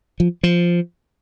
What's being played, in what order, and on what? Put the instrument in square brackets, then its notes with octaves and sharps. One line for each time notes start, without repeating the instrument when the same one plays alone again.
[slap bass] F3
F3